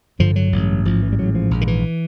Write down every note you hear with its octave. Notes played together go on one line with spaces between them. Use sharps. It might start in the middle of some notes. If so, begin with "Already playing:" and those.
A1 G2 D3 F3
F#3
A1 G2 D3
A1 G#2 F3
E3
G3
A1 G#2 F#3
F3
A#1 G#2
D#3
E3